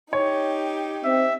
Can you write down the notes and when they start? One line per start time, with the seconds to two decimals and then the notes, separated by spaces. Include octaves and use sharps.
0.13 D#4 G4 C#5
1.05 C4 E5